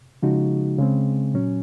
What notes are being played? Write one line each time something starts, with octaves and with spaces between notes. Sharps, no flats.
C#3 F3 G#3 D#4 F#4
C#3 G#3 C4
A#2 F#3 C#4